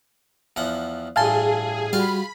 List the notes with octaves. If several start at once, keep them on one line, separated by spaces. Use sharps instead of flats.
E2 F3 F#5
A1 G2 G#4 F5 G#5 A5 C6
G3 F4 F#4 F5 B5